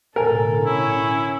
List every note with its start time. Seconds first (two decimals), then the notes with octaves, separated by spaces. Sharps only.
0.16 B1 A2 D3 A4 A#4 G#5
0.66 C#4 E4